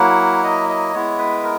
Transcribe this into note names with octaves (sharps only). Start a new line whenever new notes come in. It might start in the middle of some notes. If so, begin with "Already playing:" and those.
Already playing: F#3 A#3 E4 F#5
D#5
D#5
G#3 B3 E4 C#5
B4
A#4